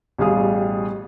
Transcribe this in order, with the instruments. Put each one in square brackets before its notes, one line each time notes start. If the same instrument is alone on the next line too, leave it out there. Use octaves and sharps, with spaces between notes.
[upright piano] A1 B2 G3 G#4 F5 D#6